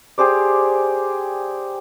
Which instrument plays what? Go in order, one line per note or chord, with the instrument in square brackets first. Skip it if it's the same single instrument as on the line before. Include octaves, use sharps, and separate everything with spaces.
[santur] G4 G#4 C5 D5